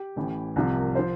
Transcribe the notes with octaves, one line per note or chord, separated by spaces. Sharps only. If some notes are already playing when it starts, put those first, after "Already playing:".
Already playing: G4
A1 A2 E3
C2 C3 F3
A#4
F3 C5